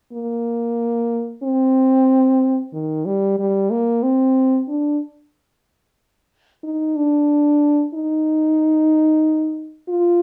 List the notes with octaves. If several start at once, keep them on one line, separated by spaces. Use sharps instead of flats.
A#3
C4
D#3
G3
G3
A#3
C4
D4
D#4
D4
D#4
F4